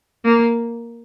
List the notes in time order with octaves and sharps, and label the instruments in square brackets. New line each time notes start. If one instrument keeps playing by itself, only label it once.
[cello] A#3